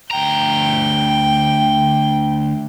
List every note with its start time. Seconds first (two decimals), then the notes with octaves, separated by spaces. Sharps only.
0.11 D2 G5 A#5